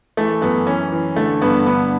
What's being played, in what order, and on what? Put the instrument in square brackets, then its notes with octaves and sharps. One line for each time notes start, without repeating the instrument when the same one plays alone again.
[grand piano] E3 A3
F#2 B3
E3 C#4
E3
D3 A3
G2 B3
D3 B3